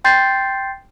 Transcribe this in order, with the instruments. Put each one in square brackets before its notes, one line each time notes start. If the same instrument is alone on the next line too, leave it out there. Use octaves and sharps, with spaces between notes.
[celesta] G5 C6 G6 A6 C7